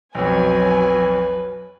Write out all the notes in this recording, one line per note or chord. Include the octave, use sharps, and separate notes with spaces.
B1 F2 F#3 B4 G#5